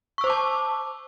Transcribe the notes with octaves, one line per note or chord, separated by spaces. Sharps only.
C5 A5 C#6 D6 E6